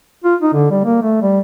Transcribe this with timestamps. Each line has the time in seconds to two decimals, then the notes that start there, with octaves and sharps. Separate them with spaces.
0.24 F4
0.42 D#4
0.54 D3
0.71 G3
0.85 A#3
1.02 A3
1.22 G3